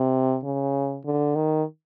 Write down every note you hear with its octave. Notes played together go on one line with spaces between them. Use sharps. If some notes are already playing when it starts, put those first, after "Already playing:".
Already playing: C3
C#3
D3
D#3